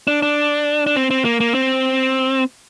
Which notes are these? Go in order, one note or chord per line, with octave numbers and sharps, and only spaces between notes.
D4
D4
D4
C4
C4
A#3
A#3
C4